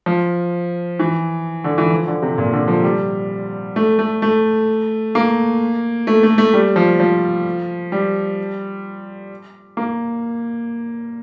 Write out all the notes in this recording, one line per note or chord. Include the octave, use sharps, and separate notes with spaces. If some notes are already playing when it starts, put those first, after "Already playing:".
F3
E3
D3
E3
F3
D3
C3
A#2
D3
F3
G3
A3
A3
A3
A#3
A3
A3
A3
G3
F3
F3
G3
A#3